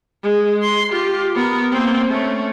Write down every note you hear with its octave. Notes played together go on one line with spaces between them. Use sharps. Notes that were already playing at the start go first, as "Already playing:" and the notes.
G#3
C6
F4 G4
B3 A#4
A#3 C4
A3 C#4